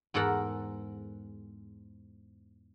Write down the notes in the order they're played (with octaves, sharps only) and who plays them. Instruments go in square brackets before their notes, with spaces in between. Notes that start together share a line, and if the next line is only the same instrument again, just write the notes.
[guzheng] E2 G#2 A4 A#4 F#5